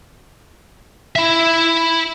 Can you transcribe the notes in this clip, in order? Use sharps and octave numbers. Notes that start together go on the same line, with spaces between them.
E4 E5